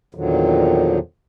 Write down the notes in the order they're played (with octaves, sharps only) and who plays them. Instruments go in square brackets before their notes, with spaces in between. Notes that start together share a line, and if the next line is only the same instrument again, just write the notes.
[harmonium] E2 A#2 D3 D#3 F3 F#3